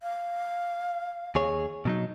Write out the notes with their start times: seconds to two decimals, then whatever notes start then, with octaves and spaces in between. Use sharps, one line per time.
0.03 F5
1.35 D#2 G#4 C#5
1.85 B2 F#3 D#4